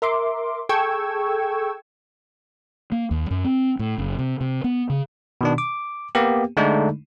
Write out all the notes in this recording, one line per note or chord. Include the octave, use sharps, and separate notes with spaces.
A#4 E5 C6 D6
G#4 A4 G5 C#6 E6 G#6
A#3
D#2
F#2
C4
A2
F#1
C3
C3
B3
C#3
B2 D#3 D4
D6
A#3 B3 G4
D3 G#3 A3 D4 D#4